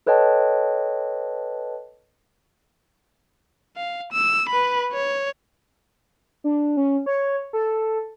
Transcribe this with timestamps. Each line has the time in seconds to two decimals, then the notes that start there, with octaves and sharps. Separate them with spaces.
0.06 A4 B4 C#5 D#5 G5 A5
3.77 F5
4.12 E6
4.49 B4 B5
4.93 C#5
6.44 D4
6.77 C#4
7.06 C#5
7.53 A4